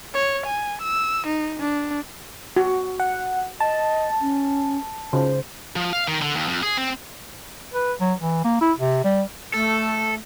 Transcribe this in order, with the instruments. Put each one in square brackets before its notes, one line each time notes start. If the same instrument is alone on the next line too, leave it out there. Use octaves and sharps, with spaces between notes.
[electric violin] C#5
G#5
E6
D#4
D4
[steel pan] F#4
[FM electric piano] F#5
[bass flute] D#5 [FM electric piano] A5
[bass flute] C#4
[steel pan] C#3 [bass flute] C5
[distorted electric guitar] F3
F5
D#3
D3
D#2
F2
G#4
C4
[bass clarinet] B4
F#3
E3
A#3
E4
C3
G3
[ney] A3 [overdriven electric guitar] A4